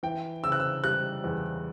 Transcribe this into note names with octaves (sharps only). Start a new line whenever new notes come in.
E3 G5
C#3 E6
F#6
E6
G3 F#6
E2